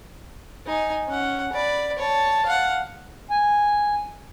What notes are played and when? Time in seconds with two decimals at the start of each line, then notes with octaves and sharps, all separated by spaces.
0.66 D#4 G#5
1.08 C#4 F#5
1.53 D5 B5
1.98 C#5 A5
2.45 F5 F#5
3.30 G#5